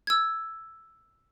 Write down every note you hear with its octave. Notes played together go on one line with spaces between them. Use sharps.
E6 G#6